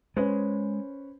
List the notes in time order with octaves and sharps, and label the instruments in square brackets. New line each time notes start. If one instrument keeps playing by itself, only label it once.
[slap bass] G#3 [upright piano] C#4 B4 C5